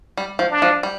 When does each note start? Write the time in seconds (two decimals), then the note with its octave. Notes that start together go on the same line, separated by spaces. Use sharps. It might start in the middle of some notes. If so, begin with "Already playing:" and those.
0.17 G3
0.39 F3
0.51 D4
0.62 F3
0.83 G3